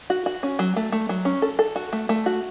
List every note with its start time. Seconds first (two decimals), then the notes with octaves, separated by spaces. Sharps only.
0.10 F#4
0.26 F#4
0.43 C#4
0.59 F#3
0.76 A3
0.92 A3
1.09 F#3
1.25 C#4
1.42 A4
1.59 A4
1.76 F#4
1.93 A3
2.09 A3
2.26 F#4